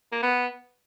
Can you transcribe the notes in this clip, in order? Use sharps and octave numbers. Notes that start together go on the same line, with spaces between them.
A#3
B3